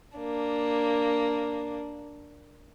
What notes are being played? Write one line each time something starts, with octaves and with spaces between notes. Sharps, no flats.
A#3 D4